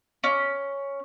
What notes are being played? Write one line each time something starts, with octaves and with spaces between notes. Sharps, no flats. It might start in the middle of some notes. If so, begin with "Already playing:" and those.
C#4